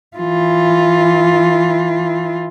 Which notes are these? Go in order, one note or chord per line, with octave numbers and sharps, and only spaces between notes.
E3 F4